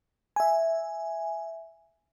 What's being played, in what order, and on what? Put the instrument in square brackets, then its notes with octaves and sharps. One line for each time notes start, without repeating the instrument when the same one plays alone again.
[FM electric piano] E5 G#5